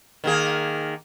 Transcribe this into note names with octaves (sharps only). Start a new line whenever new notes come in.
D#3 A#3 G#4